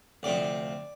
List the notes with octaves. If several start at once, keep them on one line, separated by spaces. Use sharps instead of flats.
D2 C3 F3 D5